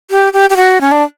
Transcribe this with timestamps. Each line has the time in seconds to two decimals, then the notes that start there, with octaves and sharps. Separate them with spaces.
0.11 G4
0.33 G4
0.50 G4
0.56 F#4
0.81 C#4
0.92 D4